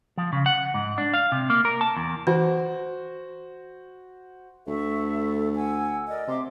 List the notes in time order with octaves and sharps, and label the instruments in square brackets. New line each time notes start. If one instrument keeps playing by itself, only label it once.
[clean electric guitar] F3
C#3
F#5
G#2
D4
F5
C3
A#3
A#4
A5
E2
[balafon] E3 [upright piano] F#4 C5
[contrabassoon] D2 [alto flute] A4 [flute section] E5 C#6
[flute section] F#5 E6 [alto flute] G#5
[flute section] A#4 D5 [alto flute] D#5
[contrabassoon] C3 [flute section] E5 C6 D6